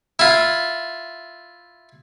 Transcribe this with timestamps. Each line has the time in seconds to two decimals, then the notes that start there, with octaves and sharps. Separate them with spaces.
0.19 E4 F4